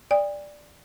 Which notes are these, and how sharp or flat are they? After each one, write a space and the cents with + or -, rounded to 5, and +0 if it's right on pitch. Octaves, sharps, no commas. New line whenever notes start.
D5 +0 G5 +45 D#6 +0